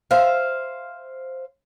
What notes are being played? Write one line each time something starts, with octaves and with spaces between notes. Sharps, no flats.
C5 E5 F5